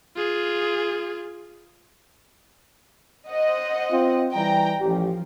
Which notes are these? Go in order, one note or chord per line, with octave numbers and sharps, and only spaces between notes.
F4 G#4
C5 D#5 F#5
C4 F4
E3 G3 G5 A#5
A1 F3 G4